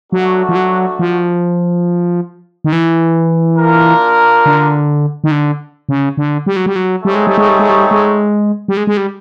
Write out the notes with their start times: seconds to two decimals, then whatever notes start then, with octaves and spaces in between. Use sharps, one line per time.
0.12 F#3 A3 D4 F#4
0.49 F3
0.55 F#3
0.99 F3
2.64 D#3
2.72 E3
3.59 A#3 D4 F4 A#4
4.46 D3
5.24 D#3
5.31 D3
5.89 C#3
6.17 D3
6.46 G3
6.56 F#3
6.66 G3
6.76 F#3
7.04 G3 A3 C4 D#4 G#4 C#5
7.15 G#3
7.27 G3
7.38 G#3
7.49 G3
7.59 G#3
7.69 G3
7.91 G#3
8.68 G3
8.77 G#3
8.87 G#3
8.97 G3